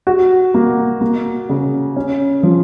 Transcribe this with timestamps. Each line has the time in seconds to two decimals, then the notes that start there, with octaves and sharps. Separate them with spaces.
0.07 F#4
0.54 A#3
1.01 A#3
1.49 C#3
1.96 C#4
2.43 F3